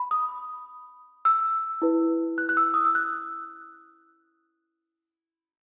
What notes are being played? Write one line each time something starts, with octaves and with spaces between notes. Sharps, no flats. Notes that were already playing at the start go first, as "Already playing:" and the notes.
Already playing: B5
D#6
E6
E4 B4
F#6
F#6
E6
D#6
E6
F#6